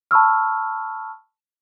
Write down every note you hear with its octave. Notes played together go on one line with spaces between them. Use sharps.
A5 B5 C#6 E6 F6